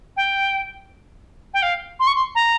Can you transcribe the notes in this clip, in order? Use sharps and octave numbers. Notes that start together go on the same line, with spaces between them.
G5
G5
F5
C6
C#6
C6
A#5